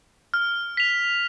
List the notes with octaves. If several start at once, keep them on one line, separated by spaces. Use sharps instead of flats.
F6
B6 F7